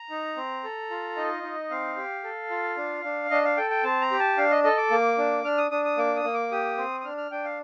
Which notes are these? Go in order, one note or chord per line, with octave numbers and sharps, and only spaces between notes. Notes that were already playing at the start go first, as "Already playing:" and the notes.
Already playing: A#5
D#4
C4
A4
F4
D#4 D#5
D#4
C4 F5
G4
A4
F4
D4
D4
D4 D#5
F5
A4 G5
G5
C4 A5
A#5
G4
A5
D4 F5
D#5
A4 D#5
D6
A#3
D4
D4 F6
D#6
D4 D#6
D#6
A#3 D6
D#6
A#3
D6
G4 D#6
C4
D#6
D4 F6
F6
D4 G5
F5